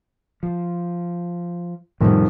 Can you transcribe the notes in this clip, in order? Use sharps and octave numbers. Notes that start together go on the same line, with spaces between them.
F3
F2 A2 C3 D#3 G3